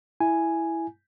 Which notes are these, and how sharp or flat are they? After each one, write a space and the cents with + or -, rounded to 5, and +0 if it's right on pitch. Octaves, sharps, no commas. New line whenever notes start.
E4 +0 G#5 +0